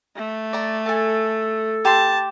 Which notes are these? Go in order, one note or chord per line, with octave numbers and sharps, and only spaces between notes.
A3
D5 A#5
A4 G#5 A5
G4 A5 C6